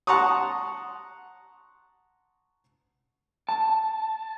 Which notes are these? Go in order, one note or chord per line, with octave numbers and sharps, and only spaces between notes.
F#5 A5 A#5 C6 C#6 D#6
A5